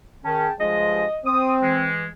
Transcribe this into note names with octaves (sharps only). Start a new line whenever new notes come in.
D#3 C#4 G#4 G5 A5
G2 F3 G#3 D#5
C4 D#6
E3 G#3